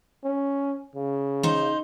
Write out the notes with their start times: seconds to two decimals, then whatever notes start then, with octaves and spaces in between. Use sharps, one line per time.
0.24 C#4
0.95 C#3
1.43 D#4 C5